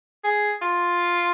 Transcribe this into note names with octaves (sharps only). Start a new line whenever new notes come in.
G#4
F4